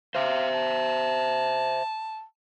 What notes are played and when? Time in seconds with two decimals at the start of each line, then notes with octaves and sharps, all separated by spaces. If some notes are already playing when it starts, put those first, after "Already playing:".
0.15 C5 E5 F5
0.54 A5